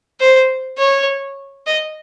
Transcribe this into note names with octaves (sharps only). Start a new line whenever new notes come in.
C5
C#5
D#5